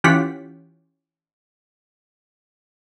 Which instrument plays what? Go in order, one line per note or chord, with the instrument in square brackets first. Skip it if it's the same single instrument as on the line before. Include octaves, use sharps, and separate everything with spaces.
[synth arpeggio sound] E3 C#4 F4 G4 F#5 B6